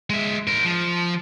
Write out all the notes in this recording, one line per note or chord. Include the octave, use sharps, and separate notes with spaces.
G#3 E5
A#4 C5
F3